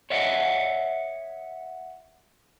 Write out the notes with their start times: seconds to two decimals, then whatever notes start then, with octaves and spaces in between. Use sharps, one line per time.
0.10 C#5 D#5 E5 F#5